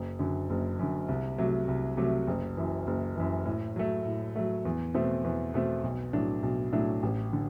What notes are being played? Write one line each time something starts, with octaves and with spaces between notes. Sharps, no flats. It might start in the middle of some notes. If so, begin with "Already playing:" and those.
Already playing: F#1
F#2 D3
F#1
F#2 D3
C2
C3 F#3 A3
C2
C3 F#3 A3
F#1
F#2 E3
F#1
F#2 E3
A2
F#3 A3
A2
F#3 A3
E2
B2 A3 C4
E2
B2 A3 C4
B1
A2 F#3 A3 D4
B1
A2 F#3 A3 D4
A1
D3